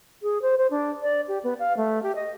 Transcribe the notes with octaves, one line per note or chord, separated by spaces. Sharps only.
G#4
C5
C5
D4
D5
G4
B3
F5
A3
G4
D#5